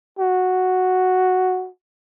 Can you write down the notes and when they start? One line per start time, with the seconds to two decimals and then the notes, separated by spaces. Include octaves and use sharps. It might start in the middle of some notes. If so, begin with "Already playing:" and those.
0.19 F#4